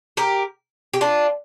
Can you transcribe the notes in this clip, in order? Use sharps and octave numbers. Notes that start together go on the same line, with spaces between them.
G4 A#4
G4
D4 F4